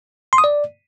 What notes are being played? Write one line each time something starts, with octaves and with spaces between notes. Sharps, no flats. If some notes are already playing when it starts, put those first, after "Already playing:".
C6
D#6
D5